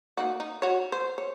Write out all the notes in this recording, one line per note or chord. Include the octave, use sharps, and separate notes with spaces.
A#3 D#4 F#4
D#4
F#4 C#5
C5
C#5